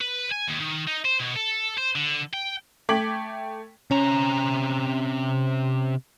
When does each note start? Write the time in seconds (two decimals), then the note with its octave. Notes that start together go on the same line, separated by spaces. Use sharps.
0.01 B4
0.31 G#5
0.48 D#2
0.60 D#3
0.87 D#4
1.05 C5
1.20 B2
1.36 A4
1.77 C5
1.96 D3
2.34 G5
2.89 A3 G5 D6 G#6 B6 F#7
3.91 C3 C#4 A#5